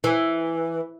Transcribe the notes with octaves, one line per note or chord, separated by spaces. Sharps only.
E3